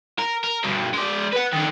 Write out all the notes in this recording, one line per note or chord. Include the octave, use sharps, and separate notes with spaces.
A#4
A#4
G2 B2
G#3 D5
B4 F#5
D3 D#3